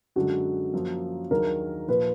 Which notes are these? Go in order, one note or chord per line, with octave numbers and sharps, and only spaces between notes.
F#2 D3 G#3 F#4
F#2 F3 A#3 F4
D#2 D#3 F#3 D4 G#4 A#4
A#2 F3 A#3 B4